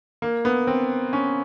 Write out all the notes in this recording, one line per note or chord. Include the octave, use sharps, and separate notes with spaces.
A#3
B3
C4
C#4